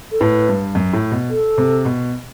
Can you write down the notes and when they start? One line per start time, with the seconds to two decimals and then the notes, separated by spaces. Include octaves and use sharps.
0.12 A4
0.21 A2 B4
0.49 G2
0.75 F#2
0.93 A2
1.12 B2
1.30 A4
1.58 C3
1.85 B2